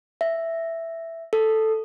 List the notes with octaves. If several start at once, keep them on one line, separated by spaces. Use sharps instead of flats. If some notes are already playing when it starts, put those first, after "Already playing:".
E5
A4